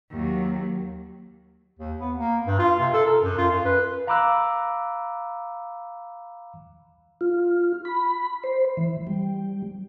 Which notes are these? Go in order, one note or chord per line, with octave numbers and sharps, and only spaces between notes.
D#2 F#3
D#2
B3
A#3
G2
F4
C3
A4
A#4
F#2
F4
F#2
B4
F5 A#5 B5 D6 E6 F#6
F4
B5
C5
E3
G3